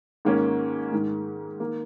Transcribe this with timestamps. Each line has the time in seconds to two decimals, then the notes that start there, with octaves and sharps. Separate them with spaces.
0.25 G#2 D#3 A#3 C#4
0.92 G#2 D#3 G#3
1.60 D#3 A#3